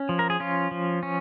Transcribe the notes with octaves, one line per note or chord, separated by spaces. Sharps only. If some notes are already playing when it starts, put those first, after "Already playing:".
Already playing: C#4
F3
A#4
G#4
C#4 F4
F3
C#4